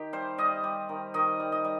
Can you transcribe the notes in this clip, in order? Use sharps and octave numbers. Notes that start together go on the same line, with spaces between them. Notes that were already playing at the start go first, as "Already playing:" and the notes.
Already playing: D#3 G4
G3 C5
G3 D#5
G3
D#3
D#3 D#5
G3
D#5
G3